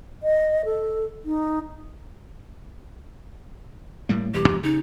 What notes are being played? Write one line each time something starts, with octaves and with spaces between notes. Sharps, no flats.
D#5
A4
D#4
A2 G3 A#3
E1 E3 G3 G4
E2 F3 G#3
C#3 D#4